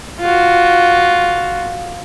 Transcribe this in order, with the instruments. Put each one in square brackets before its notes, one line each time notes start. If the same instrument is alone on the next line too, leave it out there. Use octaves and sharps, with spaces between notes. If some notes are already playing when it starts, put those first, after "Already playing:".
[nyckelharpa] F4 F#4